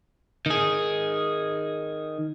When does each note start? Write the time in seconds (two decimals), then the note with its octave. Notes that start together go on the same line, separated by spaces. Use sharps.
0.46 D#3 G#4